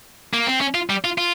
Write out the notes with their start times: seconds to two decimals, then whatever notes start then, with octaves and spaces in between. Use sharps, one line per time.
0.33 A#3
0.47 C4
0.61 C#4
0.75 F4
0.90 G3
1.04 F4
1.18 F4